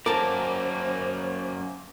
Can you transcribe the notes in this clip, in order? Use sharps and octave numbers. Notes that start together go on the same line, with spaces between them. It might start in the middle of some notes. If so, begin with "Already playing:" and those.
F#2 A#3 A#4 C5 A5 D6